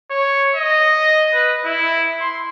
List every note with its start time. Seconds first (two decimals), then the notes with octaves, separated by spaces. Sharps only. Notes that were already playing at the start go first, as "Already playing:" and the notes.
0.11 C#5
0.55 D#5
1.34 B4
1.65 E4
2.21 C6